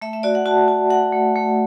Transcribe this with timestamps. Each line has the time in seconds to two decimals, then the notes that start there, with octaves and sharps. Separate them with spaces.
0.02 A3 E5
0.13 E5
0.23 F#4 D5
0.35 F#5
0.46 F#4 A5
0.68 F#4
0.90 F#4 F#5
1.13 A3
1.35 A3